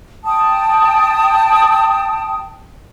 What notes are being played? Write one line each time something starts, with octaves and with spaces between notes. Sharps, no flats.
G5 A5 D#6